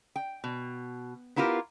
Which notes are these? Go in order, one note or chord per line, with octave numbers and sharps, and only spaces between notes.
G5
B2
B3 E4 F4 G4 A#4